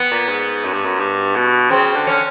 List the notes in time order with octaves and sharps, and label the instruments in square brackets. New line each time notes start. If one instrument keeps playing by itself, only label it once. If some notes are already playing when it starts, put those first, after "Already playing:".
Already playing: [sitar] B3
[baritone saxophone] A#2
G#2
F#2
G2
F#2
G2
B2
[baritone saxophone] C#3 [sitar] C4
[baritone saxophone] D3
[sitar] C#4